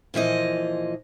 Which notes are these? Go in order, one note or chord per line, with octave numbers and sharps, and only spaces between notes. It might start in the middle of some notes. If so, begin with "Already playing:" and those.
A#2 E3 F3 D#5